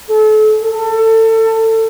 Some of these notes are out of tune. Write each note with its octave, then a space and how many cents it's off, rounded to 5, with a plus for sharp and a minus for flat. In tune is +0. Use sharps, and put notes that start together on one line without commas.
A4 -35
A4 +25